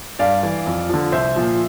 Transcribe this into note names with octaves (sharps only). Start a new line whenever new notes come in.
G2 D5 F5
E3
F2
D3 F3
C2 C5 E5
A#2 F3